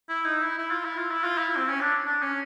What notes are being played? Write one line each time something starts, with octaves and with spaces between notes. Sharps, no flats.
E4
D#4
E4
E4
F4
E4
F4
E4
F4
E4
C4
C#4
D4
D4
C#4